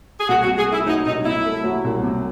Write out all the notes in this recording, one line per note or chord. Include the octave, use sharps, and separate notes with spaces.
G#4
C2 F#4
F#4
C3
G#4
A3
E4
F#3 D#4
C2 D#4
C3 E4
A3
F#3
C2
C3